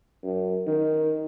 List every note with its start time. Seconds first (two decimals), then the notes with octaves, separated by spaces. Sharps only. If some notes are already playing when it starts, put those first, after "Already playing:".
0.23 F#2
0.67 D#3